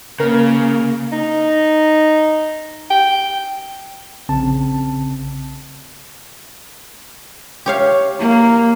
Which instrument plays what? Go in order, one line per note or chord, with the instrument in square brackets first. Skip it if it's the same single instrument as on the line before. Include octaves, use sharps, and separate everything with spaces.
[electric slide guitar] C#3 [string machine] A#3 [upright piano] A#4
[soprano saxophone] D#4
G5
[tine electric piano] A#1 C#3 C4 A5
[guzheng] G4 C#5 F5
[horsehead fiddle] A#3